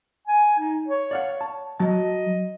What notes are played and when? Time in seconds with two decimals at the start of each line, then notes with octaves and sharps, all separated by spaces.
0.27 G#5
0.59 D#4
0.88 C#5
1.11 D5 F5 F#5
1.41 A5
1.80 F#3 D#5 A5